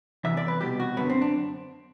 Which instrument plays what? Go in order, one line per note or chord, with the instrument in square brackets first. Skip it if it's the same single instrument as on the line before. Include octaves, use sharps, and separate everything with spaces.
[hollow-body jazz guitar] E2 C3 E3 E5
D5
B4
C2 B2 G4
F#4
F#2 D3 B3
C4
D4